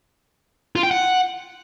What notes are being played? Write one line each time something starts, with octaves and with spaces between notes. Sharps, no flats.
F4
G5
F#5